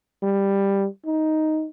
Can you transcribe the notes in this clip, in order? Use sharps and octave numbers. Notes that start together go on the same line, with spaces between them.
G3
D#4